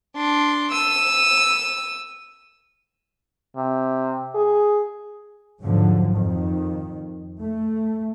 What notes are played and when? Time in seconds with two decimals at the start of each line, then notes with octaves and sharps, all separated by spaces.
0.16 D4 C6
0.71 E6 D#7
3.56 C3
4.35 G#4
5.59 E2 G#2 D3 F3 F#3
6.10 F2 D#3
7.40 A3